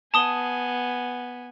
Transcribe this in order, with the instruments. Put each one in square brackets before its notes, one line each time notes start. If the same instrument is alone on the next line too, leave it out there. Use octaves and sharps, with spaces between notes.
[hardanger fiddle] B3 G#5 [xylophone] A5 D#6 G7